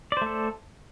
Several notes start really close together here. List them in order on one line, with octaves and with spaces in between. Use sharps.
D5 C5 A3 A4